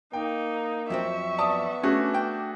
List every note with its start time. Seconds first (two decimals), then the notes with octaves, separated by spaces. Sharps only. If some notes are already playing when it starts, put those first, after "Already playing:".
0.13 A#3 D#4 G5
0.90 F2 F#3 C4 E5 C#6
1.38 B3 D5 A5 D#6
1.83 A3 C#4 D4 F#4 G#4
2.15 G5